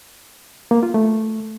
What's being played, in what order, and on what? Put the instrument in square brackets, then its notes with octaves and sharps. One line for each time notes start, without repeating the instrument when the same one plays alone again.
[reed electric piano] A#3
F4
A3